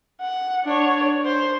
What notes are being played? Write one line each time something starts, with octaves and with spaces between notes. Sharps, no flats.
F#5
D4 C#5
C5